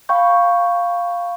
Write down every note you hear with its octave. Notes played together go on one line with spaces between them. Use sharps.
F5 G5 B5 C#6 G6